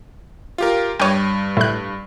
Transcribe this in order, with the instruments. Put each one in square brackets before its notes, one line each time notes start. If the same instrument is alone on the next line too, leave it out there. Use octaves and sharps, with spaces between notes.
[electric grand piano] F4 G4 A#4
[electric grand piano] G2 D#7 [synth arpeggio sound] C#5 G5
[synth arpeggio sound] A2 F#6